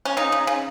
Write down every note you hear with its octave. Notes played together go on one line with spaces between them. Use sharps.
C#4
C#3 D#4
C#3
C#3